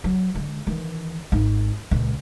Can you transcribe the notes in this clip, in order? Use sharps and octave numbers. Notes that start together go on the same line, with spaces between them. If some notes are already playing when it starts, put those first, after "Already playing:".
F#3
D3 G#3
D#3 E3
G#1 D#4
C#2 A#2